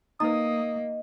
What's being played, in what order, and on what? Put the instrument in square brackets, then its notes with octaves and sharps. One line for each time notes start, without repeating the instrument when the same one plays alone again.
[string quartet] A#3 [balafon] D#4 B4 [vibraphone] D#5 [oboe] D#6